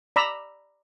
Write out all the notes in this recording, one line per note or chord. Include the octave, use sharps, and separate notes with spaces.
D5 A#5 B5 E6